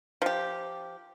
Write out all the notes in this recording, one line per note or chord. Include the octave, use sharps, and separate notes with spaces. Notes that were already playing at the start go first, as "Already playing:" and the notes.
F3 G4